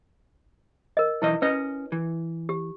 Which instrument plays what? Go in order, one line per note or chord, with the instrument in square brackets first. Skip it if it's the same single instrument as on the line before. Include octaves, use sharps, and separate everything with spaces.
[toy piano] A#4 D#5
[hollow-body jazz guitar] B1 E3 D#5 [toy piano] E4
[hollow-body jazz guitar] C#4 D#5 [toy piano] B4
[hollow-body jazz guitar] E3
[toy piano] G4